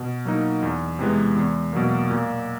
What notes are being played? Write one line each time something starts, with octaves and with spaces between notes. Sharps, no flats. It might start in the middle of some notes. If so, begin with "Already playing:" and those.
Already playing: B2
F#3 A#3 D#4
E2
C3 E3 G#3 B3
E2
B2 F#3 A#3
A#2